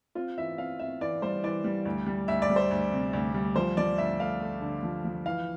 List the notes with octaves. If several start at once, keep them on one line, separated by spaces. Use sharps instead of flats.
C4 F4
E3 E5
C4 F5
C4 E5
E3 D5
G3 C5
E3 D5
G3
D2
G3
D2 E5
D5
G3
C5
D2
C3
D2
G3
F3 C5
F3 D5
D2 E5
A3 F5
A3
D3
F3
F3
E3 F5